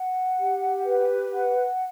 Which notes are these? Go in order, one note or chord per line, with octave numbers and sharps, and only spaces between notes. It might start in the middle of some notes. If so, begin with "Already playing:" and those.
Already playing: F#5
G4
B4
F#5